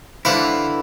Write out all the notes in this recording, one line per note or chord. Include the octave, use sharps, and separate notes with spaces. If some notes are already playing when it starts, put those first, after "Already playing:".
D3 E3 E4 B4 C5 F5